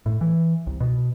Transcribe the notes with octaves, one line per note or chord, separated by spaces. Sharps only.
A2
E3
C2
B2